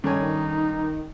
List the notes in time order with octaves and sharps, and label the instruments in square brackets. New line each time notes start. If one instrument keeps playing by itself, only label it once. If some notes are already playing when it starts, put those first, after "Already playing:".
[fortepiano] G2 C#5 [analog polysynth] D#3 [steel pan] C#4 A4 G#5 [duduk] D#4